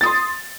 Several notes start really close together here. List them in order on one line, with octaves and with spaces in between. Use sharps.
A6 D#6 C6